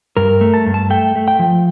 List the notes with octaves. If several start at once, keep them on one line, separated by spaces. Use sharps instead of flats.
G2 A#4
A3
A5
G2
A5
A3 G5
A3
G5
F3